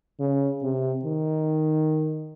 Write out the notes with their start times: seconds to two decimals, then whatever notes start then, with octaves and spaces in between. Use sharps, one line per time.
0.20 C#3
0.62 C3
1.05 D#3